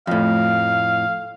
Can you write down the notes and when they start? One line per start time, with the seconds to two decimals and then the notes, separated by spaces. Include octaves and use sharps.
0.07 F2 A2 F5